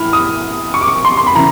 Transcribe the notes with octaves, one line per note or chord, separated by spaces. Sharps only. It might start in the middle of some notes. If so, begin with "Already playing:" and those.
Already playing: A2 E3 B5 F6
D#6
C#6
D6
C#6
C6
C6
B5
C#3 E3 A#5